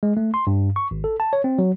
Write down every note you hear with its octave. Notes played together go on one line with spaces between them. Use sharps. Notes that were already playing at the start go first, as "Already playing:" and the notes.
G#3
A3
C6
G2
C#6
G#1
A4
A5
C#5
C4
F#3